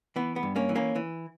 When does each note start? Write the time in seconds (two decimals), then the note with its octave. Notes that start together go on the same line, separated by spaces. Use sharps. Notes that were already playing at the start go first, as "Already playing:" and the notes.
0.16 E3 B3
0.36 B3
0.43 G2
0.56 A#3 C#4
0.69 E3
0.76 A#3 C#4
0.95 E3